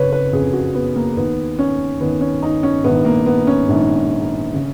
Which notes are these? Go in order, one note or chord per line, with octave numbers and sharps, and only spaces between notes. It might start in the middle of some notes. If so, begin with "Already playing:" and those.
Already playing: F#1 C#3 B4 C#5
B4
F#1 F2 C#3 G#4
F#4
B3
A#3
D#2 D#3 B3
C#4
D#2 D#3 B3
C#4
D#4
C#4
A#1 G#2 D#3 B3
A#3
B3
C#4
A#1 G#2 D#3
C#3